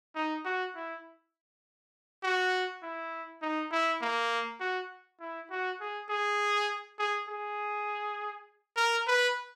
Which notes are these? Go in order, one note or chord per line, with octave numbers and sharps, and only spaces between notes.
D#4
F#4
E4
F#4
E4
D#4
E4
A#3
F#4
E4
F#4
G#4
G#4
G#4
G#4
A#4
B4